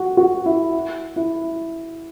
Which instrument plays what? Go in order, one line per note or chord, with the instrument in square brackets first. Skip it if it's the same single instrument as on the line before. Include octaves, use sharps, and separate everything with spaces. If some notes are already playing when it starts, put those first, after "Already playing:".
Already playing: [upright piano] F#4
F#4
E4
E4